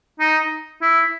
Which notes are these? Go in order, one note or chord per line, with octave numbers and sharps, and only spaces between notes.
D#4
E4